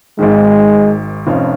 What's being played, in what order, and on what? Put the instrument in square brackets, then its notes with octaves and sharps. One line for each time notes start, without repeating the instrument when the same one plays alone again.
[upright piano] G#1 G#2 D#3 [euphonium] G#3
[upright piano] F1 F2 F3 C#4